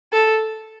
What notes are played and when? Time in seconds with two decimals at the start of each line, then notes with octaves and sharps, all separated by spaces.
0.13 A4